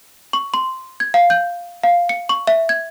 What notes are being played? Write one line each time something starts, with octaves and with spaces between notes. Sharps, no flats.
C#6
C6
G#6
F5
G6
F5
C#7
C#6
E5
G#6